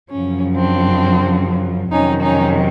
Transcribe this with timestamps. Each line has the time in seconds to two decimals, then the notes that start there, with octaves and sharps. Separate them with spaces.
0.11 F#2 C#3 F3 C#4
0.56 C4 D4
1.92 F2 C3 D#3 F#3 C#4 D#4
2.23 C#4 D#4